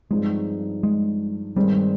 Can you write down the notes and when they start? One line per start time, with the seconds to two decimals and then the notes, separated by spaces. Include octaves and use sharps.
0.10 G2 F3 G#3 C4 D#4 G#4
0.83 G#3
1.56 G2 D#3 G3 G#3 C4